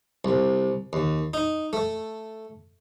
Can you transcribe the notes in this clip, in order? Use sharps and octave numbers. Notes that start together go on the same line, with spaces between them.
C2
D#2
D#4
A3